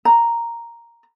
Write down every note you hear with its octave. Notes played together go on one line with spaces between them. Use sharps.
A#5